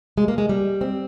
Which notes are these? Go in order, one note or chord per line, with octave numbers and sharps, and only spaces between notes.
G#3
A#3
G#3
G3
C4